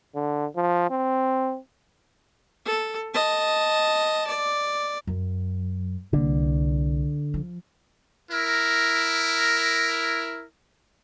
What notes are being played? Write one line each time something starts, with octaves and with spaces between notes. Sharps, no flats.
D3
F3
C4
A4
D#5 A5
D5
F#2
C2 D3 A#3
F3
E4 A#4